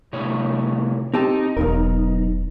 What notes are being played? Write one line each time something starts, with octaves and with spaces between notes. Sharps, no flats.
A2 C3 C#5
C4 D#4 G4 A5
E1 B1 F2 A#4